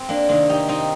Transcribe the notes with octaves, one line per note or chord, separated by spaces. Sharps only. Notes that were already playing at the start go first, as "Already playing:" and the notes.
Already playing: C4
A#3 D4
C3 D#3 A#3 D4
D#4 G4
C4 D#4